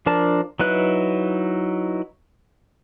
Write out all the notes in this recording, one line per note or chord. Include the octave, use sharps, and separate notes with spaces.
F3 D4 A#4 A5
F#3 D#4 E4 B4 F#6